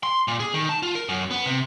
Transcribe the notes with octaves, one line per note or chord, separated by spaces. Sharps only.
C6
A#2
G#4
D#3
A5
F4
A#4
F#2
B3
C3